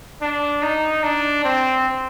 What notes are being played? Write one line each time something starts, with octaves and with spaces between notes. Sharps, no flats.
D4
D#4
D4
C4